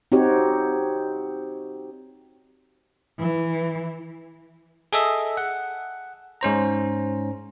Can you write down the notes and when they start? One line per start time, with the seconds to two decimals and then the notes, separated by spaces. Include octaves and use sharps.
0.12 C4 D#4 F#4 G4 C#5
3.19 E3
4.93 G#4 A4 D#5 E5
5.37 F#5
6.41 G#2 C#4 C5 A#5